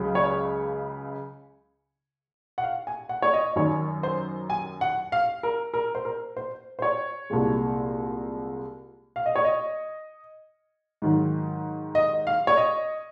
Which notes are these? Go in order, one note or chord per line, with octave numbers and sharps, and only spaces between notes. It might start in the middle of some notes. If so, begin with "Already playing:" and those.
Already playing: C#2 C#3 F#3
C#5
F#5
F5
G#5
F#5
C#5
D#5
F#2 D#3 F#3 C#5
C5
G#5
F#5
F5
A#4
A#4
C5
A#4
C5
C5
C#5
C2 A#2 G#3
F5
D#5
C#5
D#5
G#2 D#3 F#3
D#5
F5
C#5
D#5